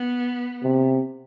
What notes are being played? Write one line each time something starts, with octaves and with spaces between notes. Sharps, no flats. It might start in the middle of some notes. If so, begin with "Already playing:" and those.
Already playing: B3
C3